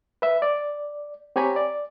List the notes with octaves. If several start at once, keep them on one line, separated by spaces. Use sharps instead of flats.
B4 E5
D5
C4 G4 C#5 G#5 A#5 B5
D5